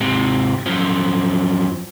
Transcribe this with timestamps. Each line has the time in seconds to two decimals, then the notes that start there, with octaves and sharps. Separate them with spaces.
0.01 G#2 C3
0.66 F#2 F3